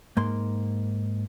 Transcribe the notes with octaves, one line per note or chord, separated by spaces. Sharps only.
G#2 A#3 C6